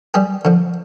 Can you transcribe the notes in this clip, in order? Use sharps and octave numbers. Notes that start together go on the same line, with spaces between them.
G3 G4 G#4
D3 F3